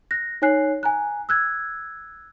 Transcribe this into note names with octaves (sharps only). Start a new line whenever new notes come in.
F#6 A#6
D#4 C#5 G#5 F#6 C7
G#5 A#5 F#6
E6 F#6 G#6